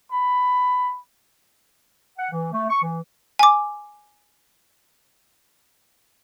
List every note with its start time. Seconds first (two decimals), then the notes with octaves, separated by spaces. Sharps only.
0.11 B5
2.18 F#5
2.32 E3
2.52 A3
2.70 C#6
2.83 E3
3.39 G#5 D6